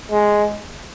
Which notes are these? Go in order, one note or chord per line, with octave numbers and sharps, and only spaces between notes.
G#3